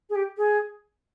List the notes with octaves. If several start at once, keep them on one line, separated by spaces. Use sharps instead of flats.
G#4
G4
G#4